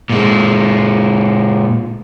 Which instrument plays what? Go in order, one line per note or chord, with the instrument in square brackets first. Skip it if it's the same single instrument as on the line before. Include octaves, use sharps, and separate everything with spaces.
[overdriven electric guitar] A#2 G#3